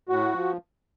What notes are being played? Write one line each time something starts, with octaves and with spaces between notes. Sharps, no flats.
A2 F#4
F3